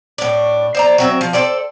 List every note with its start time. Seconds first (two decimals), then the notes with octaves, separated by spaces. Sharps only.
0.18 A2 D4
0.75 C5 D5 A#5
0.98 F#3 C4 E5
1.21 F3
1.33 A4 C5 D5 G5